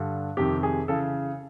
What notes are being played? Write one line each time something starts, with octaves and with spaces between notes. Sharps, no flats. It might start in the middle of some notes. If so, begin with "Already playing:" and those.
Already playing: G2 D3
F2 C3 D#3 G4
G#4
C#3 E3 A4